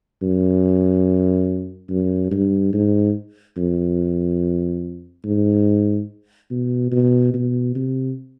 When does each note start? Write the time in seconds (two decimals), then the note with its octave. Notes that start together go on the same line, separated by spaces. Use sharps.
0.22 F#2
1.90 F#2
2.31 G2
2.73 G#2
3.57 F2
5.24 G#2
6.50 B2
6.92 B2
7.34 B2
7.76 C3